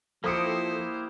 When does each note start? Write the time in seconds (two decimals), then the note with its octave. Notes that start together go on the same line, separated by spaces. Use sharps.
0.24 F3 A#3 E4 G4 A4 C5 D#6 C#7